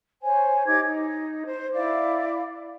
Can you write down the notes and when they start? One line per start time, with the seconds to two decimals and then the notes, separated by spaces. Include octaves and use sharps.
0.22 C5 C#5 G#5
0.66 D#4 G4 D6 G#6
0.84 D#4
1.44 C5
1.73 E4 D5 F5 D6